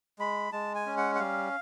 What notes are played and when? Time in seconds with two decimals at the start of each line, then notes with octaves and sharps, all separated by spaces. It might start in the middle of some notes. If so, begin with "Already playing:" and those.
0.19 G#3 B5
0.53 G#3 A5
0.75 G#5
0.86 C#4
0.97 F#5
1.15 F#5
1.19 G3 F5